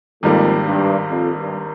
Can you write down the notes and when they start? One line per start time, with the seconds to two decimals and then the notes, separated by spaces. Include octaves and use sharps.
0.22 G#1 F2 G#2 G3 A#3
0.66 G2
1.09 F2
1.38 G2